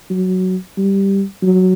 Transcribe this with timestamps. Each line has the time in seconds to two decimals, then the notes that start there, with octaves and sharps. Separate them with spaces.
0.10 F#3
0.77 G3
1.43 F#3